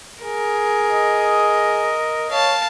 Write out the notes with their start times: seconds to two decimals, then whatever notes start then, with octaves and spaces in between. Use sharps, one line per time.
0.23 G#4 A#4
0.91 D#5
2.31 C#5 F5 A5